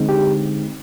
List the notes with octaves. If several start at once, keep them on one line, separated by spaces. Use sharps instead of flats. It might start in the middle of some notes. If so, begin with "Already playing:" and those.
Already playing: D3 G#3 C4 D#4
G4